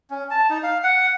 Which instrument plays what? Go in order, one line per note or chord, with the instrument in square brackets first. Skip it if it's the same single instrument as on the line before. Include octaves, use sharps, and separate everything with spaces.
[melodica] C#4
A5
D#4
F5
F#5